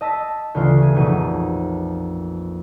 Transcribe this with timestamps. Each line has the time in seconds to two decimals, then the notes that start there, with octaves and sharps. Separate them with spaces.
0.01 D#5 A5 E6 B6
0.54 D2 C#3 E3 F4
0.82 G#4
0.95 A#1 F2 B2 D#4 D#7